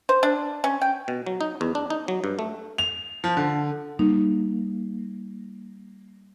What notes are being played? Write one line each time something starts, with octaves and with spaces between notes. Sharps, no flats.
C5
D4
C#4
G5
B2
F#3
D#4
E2
D4
D#4
F#3
G2
A3
F7
F3
D3
G3 A#3 D#4